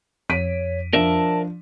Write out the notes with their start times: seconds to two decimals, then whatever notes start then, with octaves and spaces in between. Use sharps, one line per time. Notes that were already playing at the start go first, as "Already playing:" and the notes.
0.30 F2 C#5 B6 D7 D#7
0.93 F3 D4 A#4 D5 E5 A5